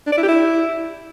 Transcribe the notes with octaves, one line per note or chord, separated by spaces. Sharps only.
D4
D5
E4
G4
E4